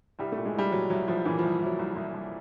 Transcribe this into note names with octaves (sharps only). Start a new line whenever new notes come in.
C2 G3
A3
A#2
G#3
C2 G3
A#2 F#3
C2 F#3
C2 F3
A#2 E3
F3
C2
C2 F#3
C2
C2
C2